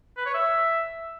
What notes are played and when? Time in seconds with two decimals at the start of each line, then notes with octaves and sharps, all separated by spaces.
0.17 B4
0.26 C#5
0.34 E5